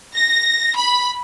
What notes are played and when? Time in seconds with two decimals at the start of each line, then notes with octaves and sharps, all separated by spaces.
0.16 A#6
0.76 B5